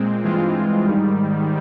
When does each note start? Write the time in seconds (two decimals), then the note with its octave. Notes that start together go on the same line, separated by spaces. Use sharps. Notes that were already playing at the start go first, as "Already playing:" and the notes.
Already playing: A#2 G#3 C4
0.24 G2 E3 G#3 C4 F4
0.87 G#2 D#3 G3